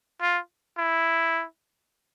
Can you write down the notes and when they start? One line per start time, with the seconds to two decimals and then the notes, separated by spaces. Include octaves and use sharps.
0.22 F4
0.77 E4